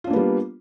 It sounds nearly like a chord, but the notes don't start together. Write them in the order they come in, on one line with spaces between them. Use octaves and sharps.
F4 D4 A#3 B3 G3